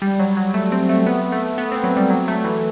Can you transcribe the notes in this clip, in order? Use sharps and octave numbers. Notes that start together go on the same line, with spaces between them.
G3
F#3
F#3
A3
C4
A3
B3
A3
B3
C4
F#3
G3
F#3
A3
E3